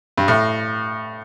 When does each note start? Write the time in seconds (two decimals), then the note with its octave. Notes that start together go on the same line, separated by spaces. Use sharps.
0.18 G2
0.28 A2